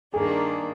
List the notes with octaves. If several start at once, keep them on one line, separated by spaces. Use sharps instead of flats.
G2 D#3 A#3 D4 G#4